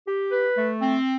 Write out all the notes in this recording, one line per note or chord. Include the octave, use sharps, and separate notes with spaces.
G4
B4
A3
C4